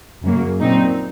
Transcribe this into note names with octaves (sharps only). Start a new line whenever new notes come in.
F#2 C#3 F#3 A#3
A#2 F#3 C4 D#4